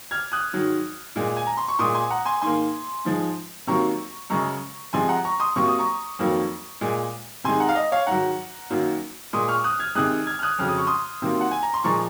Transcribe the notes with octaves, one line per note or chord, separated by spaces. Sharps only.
F6 G#6
D#6 F#6
G#2 D#3 F#3
A#2 G#3
G#5
A#5
C6
C#6
A#2 G#3 C6 D#6
G#5 C6
F#5 A#5
G#5 C6
G#2 D#3 A#3 G#5 C6
G#2 F3 G#3
C3 D#3 F#3 A#3 A#5 C#6
F#2 C#3 G#3 A#5 C#6
C3 F3 G#3 G#5 C6
F#5 A#5
A#5 C#6
C6 D#6
C3 F#3 A#3 C#6
D#6
A#5 C#6
F2 D#3 F#3 A#3
A#2 G#3
C3 D#3 G#3 G#5 C6
F#5 A#5
F5
D#5
C#5 F5
G#2 D#3 F#3 F#5 A#5
F#2 D#3 F#3 A#3
A#2 G#3 C6 D#6
C#6 F6
D#6 F#6
F6 G#6
C3 D#3 G#3 D#6 F#6
F6 G#6
F6
D#6 F#6
F2 C#3 F#3 F6
D#6
C#6
C6 D#6
C3 D#3 F#3 A#3
F#5
G#5
A#5
C6
A#2 F3 G#3 A#5 C#6